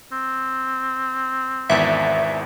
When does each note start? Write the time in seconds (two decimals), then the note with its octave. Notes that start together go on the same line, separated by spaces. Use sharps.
0.12 C4
1.69 G#1 E2 E5